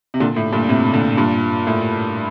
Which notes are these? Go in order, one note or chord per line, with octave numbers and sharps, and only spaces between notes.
C3
A#2 D3
A2
G2 A#2
A2 C3
A#2 D3
G2 A#2
A2